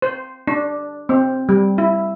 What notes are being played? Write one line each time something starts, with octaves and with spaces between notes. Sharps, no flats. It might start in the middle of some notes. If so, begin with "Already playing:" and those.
C5
D4
C4
G3
E4